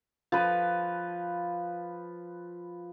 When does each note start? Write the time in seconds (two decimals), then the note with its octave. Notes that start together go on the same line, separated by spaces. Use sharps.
0.32 F3 B4